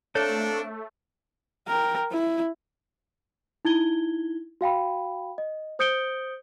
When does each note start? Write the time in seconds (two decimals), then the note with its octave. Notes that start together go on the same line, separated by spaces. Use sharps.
0.15 A3 A#3 C4 D4 A4 C#5
1.67 A#4 G5
2.11 E4
3.65 D#4 E4 G#6 G7
4.61 F#4 F5 G5 B5
5.38 D#5
5.79 C5 D#6 G6 C#7 D7 G7